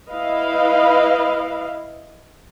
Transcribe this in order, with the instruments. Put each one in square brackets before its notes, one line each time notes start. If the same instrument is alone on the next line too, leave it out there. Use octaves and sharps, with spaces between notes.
[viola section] E4 B4 D#5 F5